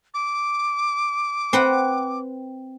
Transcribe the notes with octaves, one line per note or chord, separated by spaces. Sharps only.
D6
C4 B4 F#5